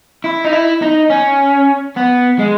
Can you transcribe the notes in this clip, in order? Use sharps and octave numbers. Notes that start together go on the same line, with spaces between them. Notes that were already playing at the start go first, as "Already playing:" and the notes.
E4
D#4
E4
D#4
C#4
B3
G#3